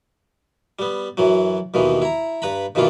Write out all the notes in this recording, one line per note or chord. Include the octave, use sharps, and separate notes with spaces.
G3 B3
F#2 E3 F#3
D#2 B2 D#3 E3
E4 A#5
G2 B4 A#5 B5
G2 B2 D#3 E3 A#3 F4